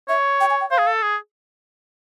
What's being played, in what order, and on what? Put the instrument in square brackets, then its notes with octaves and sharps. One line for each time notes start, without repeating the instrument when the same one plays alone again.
[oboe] C#5 [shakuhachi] E5
[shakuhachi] G5
G#5
G5
[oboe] C5 [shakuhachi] F5
[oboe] G#4
A4
G#4